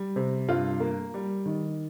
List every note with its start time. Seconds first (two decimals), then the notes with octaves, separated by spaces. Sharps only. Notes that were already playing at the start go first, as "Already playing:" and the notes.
Already playing: G3
0.16 C3
0.48 G2 F4
0.80 A#3
1.14 G3
1.46 D#3